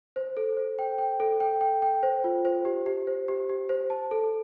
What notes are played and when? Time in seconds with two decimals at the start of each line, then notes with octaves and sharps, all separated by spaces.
0.16 C5
0.37 A4
0.57 C5
0.79 G5
0.98 G5
1.20 A4
1.40 G5
1.61 G5
1.82 G5
2.03 C5
2.24 F4
2.45 C5
2.65 G4
2.86 G4
3.07 C5
3.28 G4
3.49 G4
3.69 C5
3.90 A5
4.11 A4